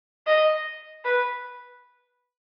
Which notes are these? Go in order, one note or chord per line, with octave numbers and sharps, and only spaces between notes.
D#5
B4